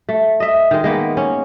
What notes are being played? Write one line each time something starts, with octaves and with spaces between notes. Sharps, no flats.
A3
D#5 E5
D#3 G#3
G#3 A#3 B3
C#4